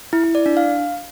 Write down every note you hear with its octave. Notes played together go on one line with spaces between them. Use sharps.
E4
E4
D5
D4
F5